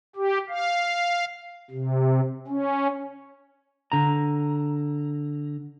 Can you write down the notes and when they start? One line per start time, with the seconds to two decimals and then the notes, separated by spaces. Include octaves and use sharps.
0.16 G4
0.49 F5
1.70 C3
2.47 C#4
3.92 D3 A#5